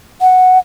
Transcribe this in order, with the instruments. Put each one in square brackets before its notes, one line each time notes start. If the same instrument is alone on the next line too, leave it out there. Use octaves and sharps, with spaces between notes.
[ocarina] F#5